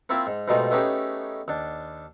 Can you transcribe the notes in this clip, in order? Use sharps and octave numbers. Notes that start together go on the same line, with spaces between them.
A#3 C4 E4 F4 E5 F5
G#2
G#2 B2 G3 A3 D#4 F4
A3 B3 C#4 D#4 G4 G#4
D#2 D4